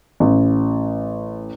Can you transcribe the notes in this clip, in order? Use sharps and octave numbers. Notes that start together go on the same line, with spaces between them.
A1